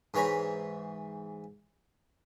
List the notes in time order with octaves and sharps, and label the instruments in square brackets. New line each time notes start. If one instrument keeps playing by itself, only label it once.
[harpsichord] G#2 E3 C#5 A#5 B5